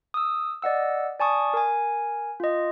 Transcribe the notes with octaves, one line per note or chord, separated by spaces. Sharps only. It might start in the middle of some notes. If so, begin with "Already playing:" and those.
D#6 E6
D5 D#5 F#5 E6
D5 G#5 A5 C#6 D#6
A#4 G#5
F4 D#5